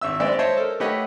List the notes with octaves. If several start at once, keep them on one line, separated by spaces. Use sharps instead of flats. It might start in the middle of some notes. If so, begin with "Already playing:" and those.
G#1 E5 E6
G#3 B3 C4 D5 E5
C5 C#5 D#5 E5 A5
A4 A#4
A3 G4 B4 C#5 D#5 F#5